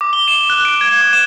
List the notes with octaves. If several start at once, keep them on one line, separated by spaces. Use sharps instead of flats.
D6
G7
E7
F#6
D7
G#6
D6
E7